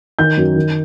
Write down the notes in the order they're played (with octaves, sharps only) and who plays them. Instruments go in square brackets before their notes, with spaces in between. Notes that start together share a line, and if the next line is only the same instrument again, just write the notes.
[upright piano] D#3 G6
F#2
D#3